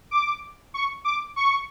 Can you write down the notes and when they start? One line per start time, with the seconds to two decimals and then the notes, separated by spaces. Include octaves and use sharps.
0.11 D6
0.74 C#6
1.04 D6
1.36 C#6